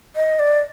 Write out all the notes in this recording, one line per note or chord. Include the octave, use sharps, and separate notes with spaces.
D#5
D5